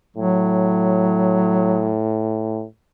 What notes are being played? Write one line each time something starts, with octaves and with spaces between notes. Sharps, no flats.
A2 F#3